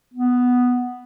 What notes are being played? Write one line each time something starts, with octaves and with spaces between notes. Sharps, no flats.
B3